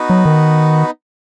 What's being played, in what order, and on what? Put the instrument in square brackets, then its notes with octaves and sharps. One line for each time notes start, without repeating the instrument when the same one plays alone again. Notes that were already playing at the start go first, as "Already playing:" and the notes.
Already playing: [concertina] B3 D#4 F#4 B4
[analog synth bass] F#3
D#3